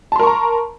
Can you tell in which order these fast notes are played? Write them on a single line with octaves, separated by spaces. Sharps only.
A5 C6 A#4 C#6 A#5